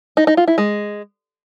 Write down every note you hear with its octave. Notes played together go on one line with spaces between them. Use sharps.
D#4
D#4
F4
E4
G#3